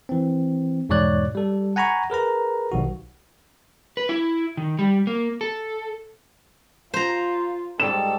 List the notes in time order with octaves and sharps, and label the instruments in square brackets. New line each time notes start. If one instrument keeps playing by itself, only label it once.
[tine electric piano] E3 C4
E2 G#2 B2 C#5 D5 F#6
G3 A4
F#5 G#5 A#5 B5 C#6
G#4 A#4 B4 A#5
B1 D#3 F#4
[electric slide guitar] B4
E4
D#3
G3
A#3
A4
[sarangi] F4 [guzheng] C5 A#5
[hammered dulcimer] G#2 G3 [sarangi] A4 [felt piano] E7